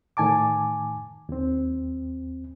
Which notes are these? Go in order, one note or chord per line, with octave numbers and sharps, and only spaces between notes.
A2 D#3 G#5 A5 D6
D#2 C4